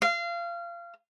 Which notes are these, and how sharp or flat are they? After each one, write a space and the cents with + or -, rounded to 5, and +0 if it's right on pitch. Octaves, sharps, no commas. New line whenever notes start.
F5 -25